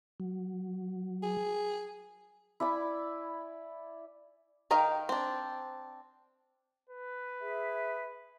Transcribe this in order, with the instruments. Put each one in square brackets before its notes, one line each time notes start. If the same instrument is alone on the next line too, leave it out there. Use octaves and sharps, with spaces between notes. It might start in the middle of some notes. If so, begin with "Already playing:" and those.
[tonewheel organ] F#3
[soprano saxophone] G#4
[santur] E4 D5 G#5 B5
[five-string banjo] D#3 A#4 D#5 F5 G5
C4 D4
[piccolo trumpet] B4
[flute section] G#4 E5